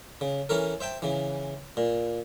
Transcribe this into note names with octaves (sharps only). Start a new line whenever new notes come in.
C#3
E3 C#4 A4 A#4
C5 E5 G5 A5
C#3 E3
A#2